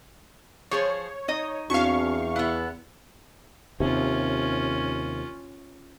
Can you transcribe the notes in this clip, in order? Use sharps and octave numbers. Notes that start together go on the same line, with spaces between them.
F3 G#4 C5 C#5
D#4 D#5
E2 C4 D4 F#4 F5 C#6
B3 E4 F#6
D#2 C3 C#4 F4